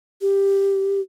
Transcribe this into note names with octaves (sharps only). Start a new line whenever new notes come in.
G4